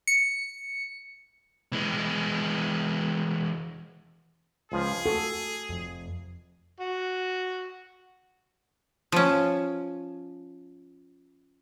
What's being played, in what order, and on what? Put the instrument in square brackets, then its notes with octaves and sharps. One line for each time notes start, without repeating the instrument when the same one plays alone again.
[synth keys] C#7
[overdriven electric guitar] E3 G#3
[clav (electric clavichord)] C#2 F3 [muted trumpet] G#4
[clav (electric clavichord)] F#4 [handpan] A4
[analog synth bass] F1
[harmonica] F#4
[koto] F3 C#4